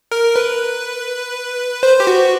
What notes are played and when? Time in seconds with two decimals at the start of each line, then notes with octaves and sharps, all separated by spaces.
0.11 A#4
0.36 B4
1.83 C5
2.00 G4
2.07 F#4